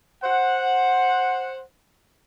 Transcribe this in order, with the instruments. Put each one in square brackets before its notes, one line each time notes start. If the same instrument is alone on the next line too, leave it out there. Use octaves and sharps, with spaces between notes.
[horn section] C5 F#5